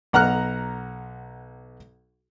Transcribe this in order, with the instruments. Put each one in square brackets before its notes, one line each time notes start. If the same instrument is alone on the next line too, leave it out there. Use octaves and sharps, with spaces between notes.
[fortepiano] B1 F#5 A#5 F6 F#6